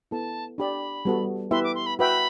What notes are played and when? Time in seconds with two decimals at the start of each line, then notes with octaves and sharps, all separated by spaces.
0.11 B3 E4 A4 A5
0.58 D4 G4 D5 B5
1.05 G3 B3 F#4 A4
1.51 B3 E4 G4 B4 E5 C6
1.64 D6
1.75 C6
1.86 B5
1.99 F#4 B4 E5 G5 B5